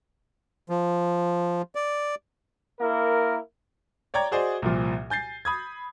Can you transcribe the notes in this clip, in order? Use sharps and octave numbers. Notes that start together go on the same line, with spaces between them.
F3
D5
A#3 E4 A#4
C#5 D5 G5 A#5 G#6
F#4 G#4 C5 D5 D#5
C2 A#2 F3
G#5 G6 A6 C7
B5 D#6 G#6